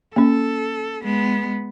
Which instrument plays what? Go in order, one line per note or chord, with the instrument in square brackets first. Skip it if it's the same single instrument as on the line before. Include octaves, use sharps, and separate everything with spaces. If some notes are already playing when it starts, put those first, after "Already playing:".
[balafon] A#3 C#4 [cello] A4
[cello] G#3 B3